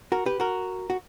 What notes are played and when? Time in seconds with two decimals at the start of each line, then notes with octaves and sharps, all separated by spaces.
0.12 F#4 A#4
0.26 G4 B4
0.40 F#4 A#4
0.90 F#4